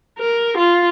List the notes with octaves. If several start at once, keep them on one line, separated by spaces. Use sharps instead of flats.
A#4
F4